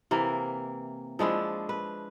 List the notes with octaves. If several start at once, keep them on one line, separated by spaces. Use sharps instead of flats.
C3 E3 A#3
F3 G#3 D4 E4
B4